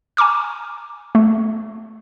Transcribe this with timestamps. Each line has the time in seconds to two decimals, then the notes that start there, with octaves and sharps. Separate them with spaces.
0.17 G#5 A#5 C#6 D6 F6
1.15 A3